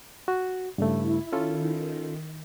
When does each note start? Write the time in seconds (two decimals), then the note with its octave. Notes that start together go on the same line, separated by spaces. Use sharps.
0.28 F#4
0.78 G2 C#3 A3 E4
1.32 D#3 C#4 F4 A4